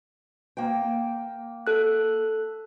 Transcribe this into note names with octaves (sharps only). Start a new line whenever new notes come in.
A#3 G5
A4 F#6